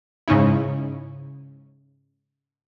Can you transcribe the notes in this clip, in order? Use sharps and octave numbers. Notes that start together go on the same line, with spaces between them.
G#2 C#3 C#4 D#4 E4